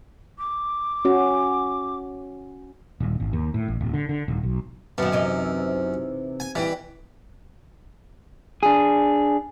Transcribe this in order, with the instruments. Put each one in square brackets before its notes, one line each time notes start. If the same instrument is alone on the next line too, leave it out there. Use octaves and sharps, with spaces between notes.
[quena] D6
[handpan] C#4 F#4
[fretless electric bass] D#1
G#1
D#2
A2
A1
D1
D3
D3
D#1
B1
[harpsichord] F#2 [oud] D#3 B3
[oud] C3 E3 D#4
[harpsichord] G#5
[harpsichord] E3 [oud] G3 G4
[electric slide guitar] D4 G#4